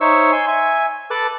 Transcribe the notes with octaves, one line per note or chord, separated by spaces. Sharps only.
D#4 C5 C#5 E5 C#6 E6
G#5 C6 E6
E5 G#5
A4 B4 A5 D6 F#6